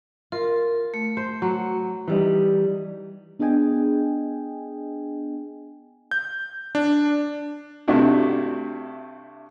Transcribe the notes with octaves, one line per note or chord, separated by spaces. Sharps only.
F4 A#4
A3
C5
F#3
E3 G3 D#4
B3 D4 G#4 D#5 G5 G#5
G6
D4
G2 C3 A3 D4 E4 F#4